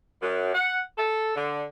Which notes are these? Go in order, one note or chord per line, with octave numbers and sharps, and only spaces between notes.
F#2
F#5
A4
D3